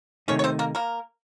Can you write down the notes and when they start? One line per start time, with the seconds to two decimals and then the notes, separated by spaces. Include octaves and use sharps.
0.28 C3 D#3 A3 C#4 D#4 C#5
0.39 C#5
0.44 C4 C5
0.59 A#3 A#4
0.75 A#3 A#4